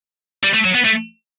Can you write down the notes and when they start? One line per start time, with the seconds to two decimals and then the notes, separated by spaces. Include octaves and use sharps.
0.44 G3
0.54 A3
0.65 F#3
0.75 B3
0.85 A3